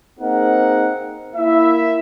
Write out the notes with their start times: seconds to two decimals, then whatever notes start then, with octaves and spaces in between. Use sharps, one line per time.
0.20 A#3 C4 D#4 G#4 A#4 F#5
1.36 A#3 E4 E5